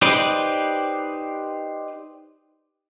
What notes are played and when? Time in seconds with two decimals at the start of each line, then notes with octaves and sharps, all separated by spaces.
0.02 D#4 G4 B4 C5 D5